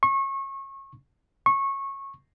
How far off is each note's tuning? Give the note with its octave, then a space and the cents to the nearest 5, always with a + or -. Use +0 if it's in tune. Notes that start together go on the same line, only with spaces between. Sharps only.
C#6 -30
C#6 -20